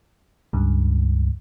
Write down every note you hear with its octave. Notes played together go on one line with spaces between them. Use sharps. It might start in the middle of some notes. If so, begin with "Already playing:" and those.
C#2 G2